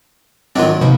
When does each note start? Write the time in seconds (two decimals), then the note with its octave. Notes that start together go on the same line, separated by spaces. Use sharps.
0.56 G#2 D#3 F#3 C4 D4 F4
0.81 C3 F3 A#3 D#4 B4